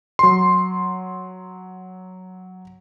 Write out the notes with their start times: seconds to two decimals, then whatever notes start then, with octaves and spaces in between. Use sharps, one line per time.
0.19 F#3 C6